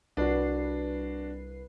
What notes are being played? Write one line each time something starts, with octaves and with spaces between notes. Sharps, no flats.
C2 D4 F#4 B4 C7